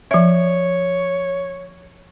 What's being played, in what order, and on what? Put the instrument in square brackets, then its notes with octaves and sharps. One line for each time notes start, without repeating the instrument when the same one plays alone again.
[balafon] F3 E5 [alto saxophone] C#5